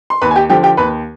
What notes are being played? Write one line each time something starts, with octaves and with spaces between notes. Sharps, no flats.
C6
D#2 B4 B5
G#5
G4 G5
D3 F3 G4 G5
G4 G5
D#2 B4 B5